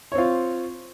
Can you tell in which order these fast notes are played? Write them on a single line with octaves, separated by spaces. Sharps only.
C#5 C4 F4